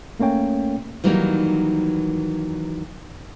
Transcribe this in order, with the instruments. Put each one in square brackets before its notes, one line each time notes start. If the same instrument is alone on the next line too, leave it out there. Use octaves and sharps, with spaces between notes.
[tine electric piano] A3 A#3 C#4 C#5 G5
[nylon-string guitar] D#3 E3 F#3 G3 A#3 D#4